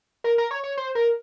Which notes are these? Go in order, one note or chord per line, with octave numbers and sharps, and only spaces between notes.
A#4
A#4
C#5
C#5
C5
A#4